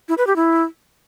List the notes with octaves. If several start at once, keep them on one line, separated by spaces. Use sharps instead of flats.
E4
B4
G4
E4